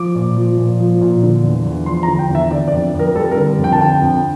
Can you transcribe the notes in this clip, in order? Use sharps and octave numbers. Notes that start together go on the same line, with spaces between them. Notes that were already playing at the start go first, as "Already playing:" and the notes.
Already playing: F3 D6
A#2
F3
A#2
F3
A#2
D3
E2
E2
F3 C6
A#5
D3
G5
E2
E5
D3 D5
D5
F2
F2
A#4
G3 A4
A#4
D3
F2
G5
A5
D3 G5
F2